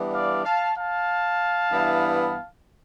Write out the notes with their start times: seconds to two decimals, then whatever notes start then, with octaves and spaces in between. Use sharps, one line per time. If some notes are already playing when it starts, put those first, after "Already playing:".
Already playing: E3 G3 B3 D4
0.13 D5 F5
0.45 F5 A5
0.76 F5 A5
1.71 G2 E3 B3 E4